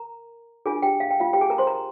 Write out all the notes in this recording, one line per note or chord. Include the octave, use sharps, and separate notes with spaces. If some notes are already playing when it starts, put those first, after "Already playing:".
Already playing: A#4 A#5
D4 F4 G#4 A#4 G#5
G4 G5
F5
G5
F4 F5
G4 G5
G#4 G#5
A#4 A#5
C5 C6
A#4 A#5